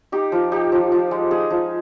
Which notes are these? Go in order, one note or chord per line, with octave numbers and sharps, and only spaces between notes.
D#4 G4
F3
D#4 G4
F3
F3
G#3
D#4 G#4
F3